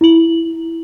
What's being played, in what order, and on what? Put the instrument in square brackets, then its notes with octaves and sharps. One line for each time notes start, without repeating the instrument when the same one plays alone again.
[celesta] E4 F#7